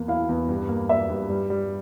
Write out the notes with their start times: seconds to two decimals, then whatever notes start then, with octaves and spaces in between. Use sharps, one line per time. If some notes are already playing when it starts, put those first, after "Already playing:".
Already playing: E2 A#3
0.08 E4 F5
0.29 E2
0.48 G2
0.69 A#3
0.89 A#3 E5
1.09 G2
1.29 G3
1.50 G3